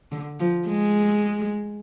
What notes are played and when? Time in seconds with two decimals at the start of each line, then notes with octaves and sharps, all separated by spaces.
0.12 D3
0.40 F3
0.68 G#3